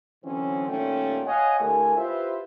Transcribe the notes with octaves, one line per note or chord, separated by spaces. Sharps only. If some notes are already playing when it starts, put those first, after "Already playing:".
D3 E3 F#3 C4 C#4
A#2 D#3 G3 A3 C#4 G5
C#5 D#5 F5 F#5 G#5
D3 A3 E4 G4 A#4 G#5
E4 F4 G4 B4 C5 E5